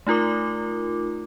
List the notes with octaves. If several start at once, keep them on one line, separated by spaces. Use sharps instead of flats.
A3 D#4 F4 A#4 D6